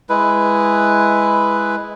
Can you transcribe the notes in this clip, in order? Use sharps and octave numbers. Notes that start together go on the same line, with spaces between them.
G#3 E4 B4